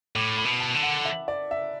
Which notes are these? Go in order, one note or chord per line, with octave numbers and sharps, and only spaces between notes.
A2 D6
B5
B2
A5
D3
F#5
E5
D5
E5